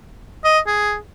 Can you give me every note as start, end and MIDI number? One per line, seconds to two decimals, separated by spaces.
0.44 0.59 75
0.67 0.96 68